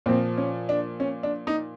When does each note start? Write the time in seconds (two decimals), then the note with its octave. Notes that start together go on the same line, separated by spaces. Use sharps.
0.06 A#2 F3 C4
0.38 C#4
0.69 D4
1.00 C#4
1.23 D4
1.47 D#4